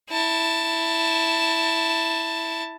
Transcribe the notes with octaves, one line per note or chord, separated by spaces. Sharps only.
E4 A5